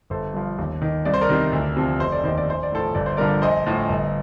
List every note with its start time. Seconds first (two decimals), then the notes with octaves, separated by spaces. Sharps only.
0.10 G1 A4 C5
0.34 G2 F3
0.58 D#2
0.82 D#3
1.05 C2 D5
1.14 C5
1.21 A#4 D5
1.29 C3 D#3
1.53 D2
1.77 C3 F3
2.00 F1 C5
2.12 D5
2.24 D#2 D#3 C5
2.38 D5
2.48 A#1 C5
2.63 D5
2.72 A2 F3 A4 C5
2.95 G1 D5
3.06 C5
3.17 G2 D3 F3 A#4 D5
3.42 A#1 C5 D#5
3.67 A2 F3
3.89 G1